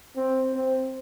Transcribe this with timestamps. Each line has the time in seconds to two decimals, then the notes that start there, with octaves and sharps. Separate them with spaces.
0.16 C4
0.54 C4